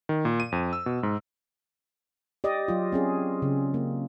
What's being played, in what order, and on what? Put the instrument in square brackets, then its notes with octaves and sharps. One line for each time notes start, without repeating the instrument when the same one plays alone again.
[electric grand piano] D#3
A#2
D#7
F2
E6
B2
G#2
[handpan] G4 D5 D#5
F#3 F4
C4 C#4 G#4
C#3
A#3